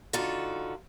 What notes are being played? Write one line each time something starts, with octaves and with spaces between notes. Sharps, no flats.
D3 D#4 F4 F#4 A4